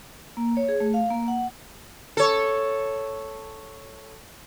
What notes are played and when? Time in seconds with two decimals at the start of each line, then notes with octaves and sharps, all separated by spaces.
0.37 A#3
0.57 C#5
0.69 G#4
0.80 A3
0.94 F5
1.10 A#3
1.28 F#5
2.17 A4 C#5